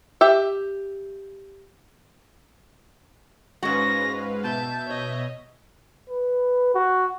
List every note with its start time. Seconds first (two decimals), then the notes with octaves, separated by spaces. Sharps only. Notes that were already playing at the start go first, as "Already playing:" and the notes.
0.21 G4 E5
3.63 G#2 G#3 C#4 F#4 B4 F5 A#6
4.44 B2 E5 A5 G6
4.87 C#5 D#5
6.10 B4
6.75 F#4